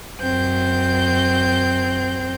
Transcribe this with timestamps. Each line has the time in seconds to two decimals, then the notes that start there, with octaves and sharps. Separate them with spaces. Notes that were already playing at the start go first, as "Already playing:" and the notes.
0.20 F#2 C4 G6